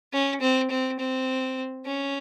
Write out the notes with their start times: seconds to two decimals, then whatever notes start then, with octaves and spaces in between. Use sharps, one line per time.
0.13 C#4
0.41 C4
0.70 C4
0.99 C4
1.86 C#4